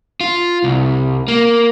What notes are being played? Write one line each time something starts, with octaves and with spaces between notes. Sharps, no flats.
F4
C2
A#3